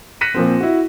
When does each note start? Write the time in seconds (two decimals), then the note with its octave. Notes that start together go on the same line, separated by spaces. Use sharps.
0.21 F#6 A#6 B6 C#7 D#7 E7
0.34 A#2 F3 C4
0.61 E4 F#4